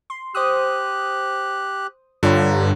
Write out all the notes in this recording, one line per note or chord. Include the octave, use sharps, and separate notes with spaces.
C6
G4 C5 D#6 F#6
G2 D3 F4 C#5 A#5